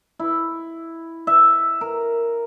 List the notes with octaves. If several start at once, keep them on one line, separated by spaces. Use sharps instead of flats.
E4
E5
A#4